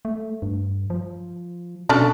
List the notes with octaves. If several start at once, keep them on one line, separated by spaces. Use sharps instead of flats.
A3
G2
F3
B2 C#4 D4 A4